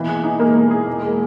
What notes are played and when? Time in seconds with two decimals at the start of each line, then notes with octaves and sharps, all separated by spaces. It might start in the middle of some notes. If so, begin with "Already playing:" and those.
Already playing: B2 E3 A#3
0.08 G#4
0.24 D#4
0.39 G#3 A#3
0.55 B2
0.71 G#4
0.87 E1
1.02 G#3